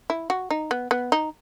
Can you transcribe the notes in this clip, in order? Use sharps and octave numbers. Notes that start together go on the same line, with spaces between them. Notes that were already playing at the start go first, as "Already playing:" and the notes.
E4
F#4
D#4
B3
B3
D#4